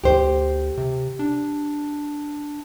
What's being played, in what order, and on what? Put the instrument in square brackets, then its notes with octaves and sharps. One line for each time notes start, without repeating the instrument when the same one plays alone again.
[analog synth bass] D2 [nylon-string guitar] G4 C5
[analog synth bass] C3
D4